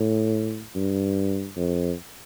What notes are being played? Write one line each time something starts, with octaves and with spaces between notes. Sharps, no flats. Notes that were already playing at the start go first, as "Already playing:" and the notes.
Already playing: A2
G2
F2